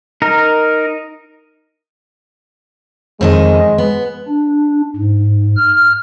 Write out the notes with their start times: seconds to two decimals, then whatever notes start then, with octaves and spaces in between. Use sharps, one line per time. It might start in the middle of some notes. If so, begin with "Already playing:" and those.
0.22 D#4 A#4
3.21 F2 D#3 G#3 D#5
3.78 B3
4.28 D4
4.96 G#2
5.57 F6